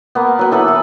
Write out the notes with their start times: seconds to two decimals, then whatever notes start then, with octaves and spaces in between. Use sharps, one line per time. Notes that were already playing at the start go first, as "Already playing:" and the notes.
0.15 A#3 B3
0.39 F#3 B4
0.51 E3 A4 B4
0.68 E3